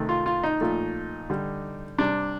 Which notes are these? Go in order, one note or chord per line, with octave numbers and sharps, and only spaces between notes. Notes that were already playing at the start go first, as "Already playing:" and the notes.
Already playing: C3 D#3 A3
F4
F4
D#4
A#2 F3 A3
D3 G3
C3 G3 D4